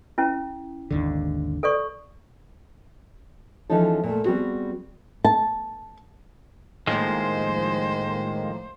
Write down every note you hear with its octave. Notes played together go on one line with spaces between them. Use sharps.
C#4 E4
G#1 D#2 D3
A4 D5 C#6
E3 F3 G#3 C#4 D#4 A4
A#2 A3
G3 B3 C4 F#4 G#4
A5
A2 D#3 F3 G#3 A#3 C5